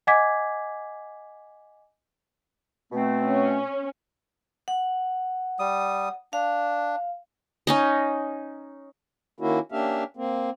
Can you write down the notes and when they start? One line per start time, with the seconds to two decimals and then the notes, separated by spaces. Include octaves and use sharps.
0.07 D#5 F#5 G#5 D6 G#6 B6
2.92 B2 A3 C4
3.23 C#4
4.68 F#5
5.59 G3 D#6
6.33 D4 F5
7.67 C#4 D#4 D#5
9.40 D#3 A#3 C#4 E4 F#4
9.72 A#3 C#4 D4 G4 E5 F5
10.17 A#3 C4